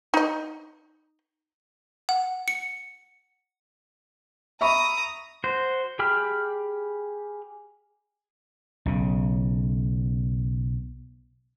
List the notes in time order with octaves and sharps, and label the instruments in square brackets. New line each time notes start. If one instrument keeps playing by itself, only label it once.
[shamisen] D#4 D#5
[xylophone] F#5
C#7
[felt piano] E5 B5 C#6 [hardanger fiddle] A#5 D#6
[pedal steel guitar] F#4 C5
G4 G#4 G5 B5 F6
[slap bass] B1 C#3